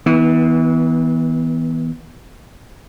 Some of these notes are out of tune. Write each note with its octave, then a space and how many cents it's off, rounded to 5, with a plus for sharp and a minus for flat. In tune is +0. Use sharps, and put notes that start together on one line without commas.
E3 -35 B3 -10